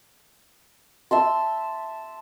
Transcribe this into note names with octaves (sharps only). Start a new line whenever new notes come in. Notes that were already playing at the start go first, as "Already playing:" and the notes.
E5 A5 C6